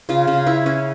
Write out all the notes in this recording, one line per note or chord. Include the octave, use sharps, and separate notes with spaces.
C#3 F4
C#3
C#4 E4
C#4